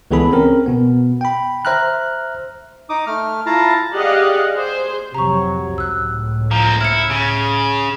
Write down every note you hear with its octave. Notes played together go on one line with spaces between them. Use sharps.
C#2 E3 B3 G#4 A4 B5
C4 C#4 A#4
B2 B3
G5 B5
C5 E5 A#5 F6 F#6
D#4 D6 D#6
A3 F6
E4 F4 F5 A5 A#5
G4 G#4 D5 D#5 F5 F#5
G#4 C5
F1 C3 F#3 A#5 C#6
C#2 A2 E6 F#6
A#2 F3 A#5
E4 F6 C#7
C#3